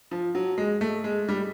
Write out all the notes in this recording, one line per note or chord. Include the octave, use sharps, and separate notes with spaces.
F3
F#3
G#3
A3
G#3
G3